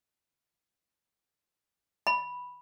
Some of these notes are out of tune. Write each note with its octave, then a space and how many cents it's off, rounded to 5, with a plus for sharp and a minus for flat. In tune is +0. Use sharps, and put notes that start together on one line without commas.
B5 -5